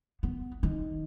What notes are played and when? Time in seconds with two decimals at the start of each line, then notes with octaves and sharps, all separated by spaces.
0.23 B3
0.63 D#3